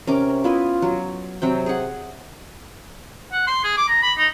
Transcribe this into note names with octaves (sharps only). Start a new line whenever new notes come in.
C3 C#4 A#4 D6
B3 E4 F4 D#5
F#3
C3 F#3 C4 G5
G#4 F#5
F#5
C6
G#4
D6
A#5
B5
D#4